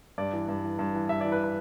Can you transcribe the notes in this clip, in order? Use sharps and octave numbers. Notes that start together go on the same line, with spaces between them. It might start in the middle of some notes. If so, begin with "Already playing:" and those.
G2 D5
E3
G2
E3
G2
E3
G2 E5
D5
E3
B4
B4